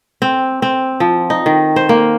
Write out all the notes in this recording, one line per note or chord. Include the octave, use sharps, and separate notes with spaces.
C4
C4
F3
D#4
D#3
C5
A#3